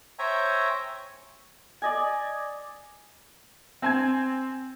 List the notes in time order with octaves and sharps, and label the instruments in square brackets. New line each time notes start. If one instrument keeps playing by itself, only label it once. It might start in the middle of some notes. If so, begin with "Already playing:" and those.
[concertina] C5 C#5 E5 G5 G#5 A#5
[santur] D5 D#5 G#5
[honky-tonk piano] C4 G#5 G#6